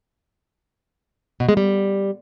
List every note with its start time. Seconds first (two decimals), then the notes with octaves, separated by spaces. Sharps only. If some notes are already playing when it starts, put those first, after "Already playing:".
1.40 B2
1.49 G#3
1.57 G3